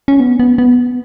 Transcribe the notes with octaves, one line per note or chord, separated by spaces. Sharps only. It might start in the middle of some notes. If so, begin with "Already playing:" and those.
C#4
B3
B3
B3